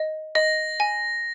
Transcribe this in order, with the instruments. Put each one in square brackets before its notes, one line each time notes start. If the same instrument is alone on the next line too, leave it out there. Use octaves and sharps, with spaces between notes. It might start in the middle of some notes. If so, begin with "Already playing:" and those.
Already playing: [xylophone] D#5
[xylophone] D#5 [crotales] A#6
[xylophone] G#5